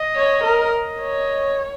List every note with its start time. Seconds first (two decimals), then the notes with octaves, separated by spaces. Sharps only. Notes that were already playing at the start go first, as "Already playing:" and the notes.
Already playing: D#5
0.16 C#5
0.44 A#4
0.72 D#5
1.01 C#5